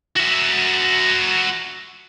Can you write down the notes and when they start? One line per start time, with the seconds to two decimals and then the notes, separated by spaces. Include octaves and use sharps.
0.16 F#4 E5